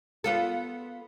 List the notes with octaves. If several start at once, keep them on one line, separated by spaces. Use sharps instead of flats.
B3 F4 A4